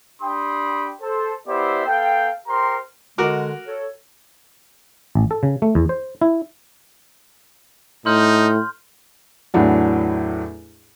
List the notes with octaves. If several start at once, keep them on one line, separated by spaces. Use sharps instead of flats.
D4 G4 G5 B5 C6 D#6
A4 C5
B3 E4 G4 C5 D5 E5
B3 A4 F5 G5
G4 A#4 C5 G5 A#5 C6
D3 G#3 F#4 A#4 D6
A4 C#5
A1
A4
C#3
A3
E2
C5
E4
A2 D#4 C6 F6 G6
E2 A2 F#3 D4